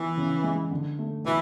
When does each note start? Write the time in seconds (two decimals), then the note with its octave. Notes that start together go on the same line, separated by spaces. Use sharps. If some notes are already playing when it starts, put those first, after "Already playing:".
Already playing: E3 B3
0.17 C#3
0.44 G#3
0.71 D3
0.99 A3
1.25 B2 E3